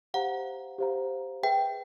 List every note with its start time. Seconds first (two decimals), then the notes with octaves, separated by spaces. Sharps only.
0.14 G4 C5 F5 F#5 A#5
0.78 G4 C5 F5 A#5
1.43 G#4 B4 E5 G5